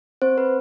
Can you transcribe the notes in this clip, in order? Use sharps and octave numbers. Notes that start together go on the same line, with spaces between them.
C4 C5
B4